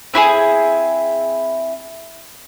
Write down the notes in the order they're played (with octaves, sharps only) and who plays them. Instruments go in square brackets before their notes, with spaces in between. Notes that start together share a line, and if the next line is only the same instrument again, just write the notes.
[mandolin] C4 E4 F4 G#4